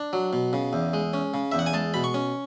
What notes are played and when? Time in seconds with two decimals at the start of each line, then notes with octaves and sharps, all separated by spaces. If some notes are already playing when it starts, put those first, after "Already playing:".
Already playing: D4
0.13 F#3
0.33 B2
0.53 C#3
0.73 E2
0.94 G#3
1.14 C#4
1.34 C#3
1.52 E2 E5
1.59 F#5
1.66 G#5
1.73 G#3 A5
1.94 B2 B5
2.04 C#6
2.14 C#4